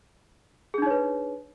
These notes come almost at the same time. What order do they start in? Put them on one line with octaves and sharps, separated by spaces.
G#4 D4 D#4 C#5 B4